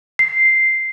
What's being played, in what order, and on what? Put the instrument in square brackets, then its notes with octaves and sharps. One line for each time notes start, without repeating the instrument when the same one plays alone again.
[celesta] C7